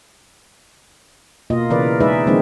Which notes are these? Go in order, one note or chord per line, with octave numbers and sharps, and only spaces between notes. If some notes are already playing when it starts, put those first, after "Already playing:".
B2 A#3 F4 D#5
C#3 E3 A#4 B4 D5
G#3 D#4 G#4 B4 D5 E5
D#3 F3 G#3 A#3 C4 D#4